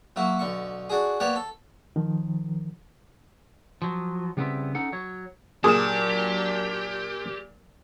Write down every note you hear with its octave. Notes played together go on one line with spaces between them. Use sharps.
F#3 A#3 E4 F#4
B1 D3 C#6
D4 F#4 G#4
A#3 B3 G4 C#5 D5 F#5
A4
D#3 F3
F3 F#3
C#3 G3 B3 C4 E4
C#4 D#4 A4 F#5
F#3 C#5
A#2 F#3 D4 G4 G#4 E7